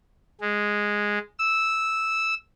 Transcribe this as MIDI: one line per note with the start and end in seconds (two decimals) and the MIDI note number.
0.41 1.18 56
1.39 2.35 88